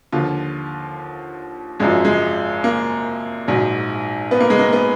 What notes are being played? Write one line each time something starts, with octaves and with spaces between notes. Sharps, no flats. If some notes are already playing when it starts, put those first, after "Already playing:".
D#2 D3 F3 F4
G#1 F#2 F3 G#3
G#3
A#3
A#1 G#2 F#3
B3
A#3
G#3
A#3
B3